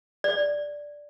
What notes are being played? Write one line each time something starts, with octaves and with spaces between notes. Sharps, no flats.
D5